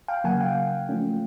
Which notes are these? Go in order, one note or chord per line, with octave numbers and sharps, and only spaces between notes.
F5 G5
C#3 F#3 A#3 F#5 G#5
F5 G5
F3 A3 C#4